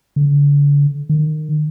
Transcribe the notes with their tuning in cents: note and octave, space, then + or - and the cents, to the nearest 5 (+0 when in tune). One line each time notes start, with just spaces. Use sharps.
D3 -40
D#3 -20